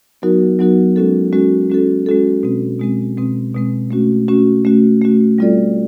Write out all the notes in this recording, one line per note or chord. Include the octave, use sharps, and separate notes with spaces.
F#3 B3 D#4 F#4 A#4
F#3 B3 D#4 F#4 A#4
G#3 C#4 F#4 A4
G#3 C#4 F#4 A4
G#3 C#4 F#4 A4
G#3 C#4 F#4 A4
B2 G#3 C4
B2 G#3 C4
B2 G#3 C4
B2 G#3 C4
A3 C#4 F#4
A3 C#4 F#4
A3 C#4 F#4
A3 C#4 F#4
G3 C4 F4 A4 D5